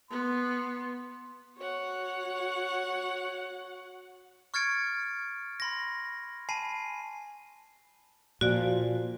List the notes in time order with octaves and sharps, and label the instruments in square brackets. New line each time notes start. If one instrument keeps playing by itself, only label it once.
[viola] B3 [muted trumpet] C6
[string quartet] F#4 C#5 F#5
[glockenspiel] C#6 F6 G#6 A6 C#7 D7
B5 C6 A#6
G#5 A5 B5 C7 D#7
[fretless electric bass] A#2 [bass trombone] F3 [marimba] F#4 D5